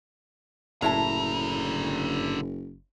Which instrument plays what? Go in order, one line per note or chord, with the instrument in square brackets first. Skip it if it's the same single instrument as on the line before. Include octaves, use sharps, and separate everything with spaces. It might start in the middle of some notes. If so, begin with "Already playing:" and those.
[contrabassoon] F#1 [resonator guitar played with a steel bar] A2 E4 A5 [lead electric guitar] D3 A#5